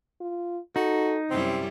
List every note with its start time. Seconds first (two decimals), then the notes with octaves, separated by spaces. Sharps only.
0.21 F4
0.76 D#4 F#4 A4
1.31 F#2 C3 G3 C4 E4